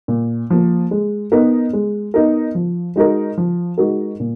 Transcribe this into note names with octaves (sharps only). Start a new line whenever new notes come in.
A#2
F3 A#3
G#3
B3 D#4 A#4
G#3
B3 D#4 A#4
F3
G#3 D#4 F#4 A#4
F3
G#3 D#4 F#4 A#4
A#2